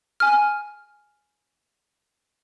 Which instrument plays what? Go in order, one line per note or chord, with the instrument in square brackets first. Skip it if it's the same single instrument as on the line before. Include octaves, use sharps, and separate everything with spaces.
[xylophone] G#5 F6